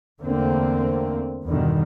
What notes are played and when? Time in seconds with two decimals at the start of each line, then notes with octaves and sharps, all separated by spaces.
0.21 E2 D3 A3 A#3 C4
1.45 E2 G2 B2 D3 D#3